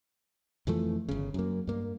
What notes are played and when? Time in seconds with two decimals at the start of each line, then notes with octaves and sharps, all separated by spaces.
0.67 F2 E3 F3 A3
1.09 G1 C#3
1.34 F#2 A#3
1.67 G2 A#3